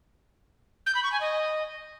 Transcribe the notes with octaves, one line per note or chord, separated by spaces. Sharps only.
G6
B5
C#6
G#5
D#5